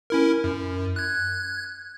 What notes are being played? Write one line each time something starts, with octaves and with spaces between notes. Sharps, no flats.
C#4 E4 A#4
F#2
F#6 G#6